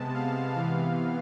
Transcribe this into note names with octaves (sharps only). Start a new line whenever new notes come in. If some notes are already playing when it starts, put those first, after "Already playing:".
Already playing: C3 G#3 B3 A5
F5
C3 E3 B3 F5